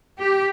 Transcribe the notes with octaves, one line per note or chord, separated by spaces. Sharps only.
G4